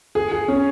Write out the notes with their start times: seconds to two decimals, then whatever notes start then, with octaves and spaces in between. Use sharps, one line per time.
0.15 G#4
0.32 G#4
0.48 C#4